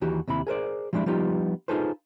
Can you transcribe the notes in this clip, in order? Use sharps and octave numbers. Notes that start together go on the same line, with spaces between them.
D#2 E3 F#4 G4
D#2 C3 E4 B5
G#4 A#4 C5 D5
F3 G3 G#3 D4 E4
F3 G3 B3 D#4 F4 G4
D#4 F4 G#4 A4 B4 C5